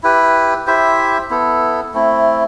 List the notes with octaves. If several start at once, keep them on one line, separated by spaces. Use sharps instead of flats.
E4 G4 B4
E4 G4 C5 E5
B3 E4 A4
A3 C4 E4